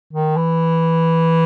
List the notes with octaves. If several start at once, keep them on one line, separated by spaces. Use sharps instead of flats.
D#3
E3